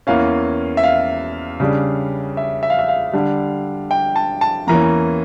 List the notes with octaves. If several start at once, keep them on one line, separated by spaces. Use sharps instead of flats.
E2 E3 A#3 C#4 F5
E5
F5
C#3 G3 D4
E5
E5
F5
E5
F5
D3 G3 D4
G5
A5
A5
E2 E3 A#3 C#4 A#5